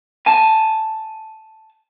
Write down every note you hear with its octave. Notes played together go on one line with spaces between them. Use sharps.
G#5 A5